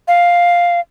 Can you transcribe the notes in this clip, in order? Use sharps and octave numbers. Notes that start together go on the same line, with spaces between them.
F5